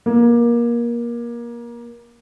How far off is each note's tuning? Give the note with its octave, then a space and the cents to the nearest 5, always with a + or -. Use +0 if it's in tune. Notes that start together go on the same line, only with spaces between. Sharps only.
A#3 +25